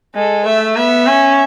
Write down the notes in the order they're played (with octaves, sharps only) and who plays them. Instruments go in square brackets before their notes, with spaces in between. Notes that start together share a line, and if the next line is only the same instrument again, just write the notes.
[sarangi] G#3 [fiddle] A4
[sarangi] A3 [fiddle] E5
[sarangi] B3 [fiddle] E5
[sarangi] C#4